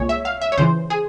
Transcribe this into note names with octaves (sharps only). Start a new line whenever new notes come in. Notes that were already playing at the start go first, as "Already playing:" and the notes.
Already playing: C2 A#2 G#3 C#5
E5
F5
E5
C#5
C#2 C#3 E3 C5
G#4